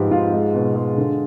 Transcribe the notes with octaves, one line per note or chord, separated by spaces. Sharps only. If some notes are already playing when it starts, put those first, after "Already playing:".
Already playing: G#2 F3 G4 B4
G#2 F4
G#3
B2
G#3
D3